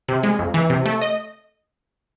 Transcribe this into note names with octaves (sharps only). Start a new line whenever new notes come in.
C3
G#3
F2
E3
C3
A3
D#5